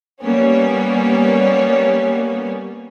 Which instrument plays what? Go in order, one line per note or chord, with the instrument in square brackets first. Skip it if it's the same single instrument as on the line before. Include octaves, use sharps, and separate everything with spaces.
[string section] G3 A#3 B3 C#4